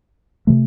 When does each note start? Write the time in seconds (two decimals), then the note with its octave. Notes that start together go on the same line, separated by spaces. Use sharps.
0.47 C3 E3 A3